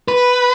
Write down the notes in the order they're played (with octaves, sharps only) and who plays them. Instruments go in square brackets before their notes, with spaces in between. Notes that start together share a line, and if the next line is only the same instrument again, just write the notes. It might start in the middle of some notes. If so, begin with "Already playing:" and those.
[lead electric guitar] B4